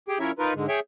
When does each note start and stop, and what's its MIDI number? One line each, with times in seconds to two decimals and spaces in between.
0.08 0.18 67
0.08 0.18 68
0.08 0.18 79
0.20 0.32 53
0.20 0.32 61
0.20 0.32 64
0.20 0.32 70
0.20 0.32 73
0.20 0.32 76
0.39 0.54 63
0.39 0.54 65
0.39 0.54 70
0.39 0.54 71
0.55 0.67 44
0.55 0.67 50
0.55 0.67 56
0.68 0.80 68
0.68 0.80 73
0.68 0.80 76
0.68 0.80 79